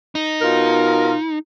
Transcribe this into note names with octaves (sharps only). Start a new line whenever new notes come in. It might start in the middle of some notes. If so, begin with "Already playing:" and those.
D#4
B2 F4 A#4